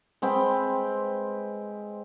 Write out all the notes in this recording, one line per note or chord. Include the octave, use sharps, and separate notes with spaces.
G#3 C4 B4 G5